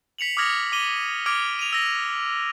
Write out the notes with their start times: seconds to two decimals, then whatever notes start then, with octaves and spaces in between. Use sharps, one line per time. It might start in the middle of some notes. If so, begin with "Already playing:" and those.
0.18 B6 C#7 F7 F#7
0.37 D6 D#6 F6 G#6 A#6 C#7
0.72 D6 D#7 G7
1.26 D6 F6 G#6 D7
1.59 D#7 F7
1.73 E6 A#6